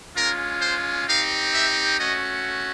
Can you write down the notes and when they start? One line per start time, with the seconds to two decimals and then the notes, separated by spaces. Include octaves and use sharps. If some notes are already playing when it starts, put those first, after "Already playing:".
0.16 G#3 C#4 F4 A#4
0.61 C5
1.07 C4 D#4 G4 F5
1.53 E5
1.99 A3 C#4 F#4 D#5